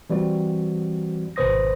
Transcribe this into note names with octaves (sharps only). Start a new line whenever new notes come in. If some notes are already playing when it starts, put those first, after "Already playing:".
E3 G3 C4 F#4
G#1 B2 B4 C5 D#6 A#6